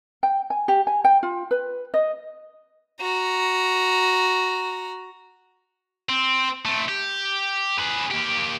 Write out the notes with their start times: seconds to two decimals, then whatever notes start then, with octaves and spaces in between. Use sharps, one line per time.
0.23 G5
0.50 G#5
0.68 G4
0.87 G#5
1.04 G5
1.23 F4
1.51 B4
1.94 D#5
3.00 F#4 A#5
6.09 C4
6.65 A3 C4
6.89 G4
7.79 G#4 B4
8.11 A#3 G4